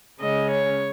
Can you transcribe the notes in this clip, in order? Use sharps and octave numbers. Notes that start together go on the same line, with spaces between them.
C#3 G#3 C#4 D#5
C#5